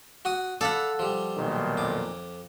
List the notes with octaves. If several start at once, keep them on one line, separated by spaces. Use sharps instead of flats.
F#4 F#5 D#6
A4 D5 F5 F#5 B5
F3 G3
B1 A#2 D#3
F2 D6